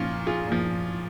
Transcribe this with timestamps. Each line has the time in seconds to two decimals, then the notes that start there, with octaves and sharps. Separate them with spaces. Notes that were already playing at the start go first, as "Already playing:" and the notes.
Already playing: A#2 F3 C#4 F4
0.27 F4 G#4
0.48 A#2 F3